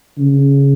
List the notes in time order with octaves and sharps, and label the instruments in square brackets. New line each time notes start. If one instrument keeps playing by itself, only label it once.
[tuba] C#3